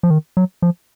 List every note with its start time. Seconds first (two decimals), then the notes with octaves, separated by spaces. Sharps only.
0.03 F3
0.10 D#3
0.37 F#3
0.62 F3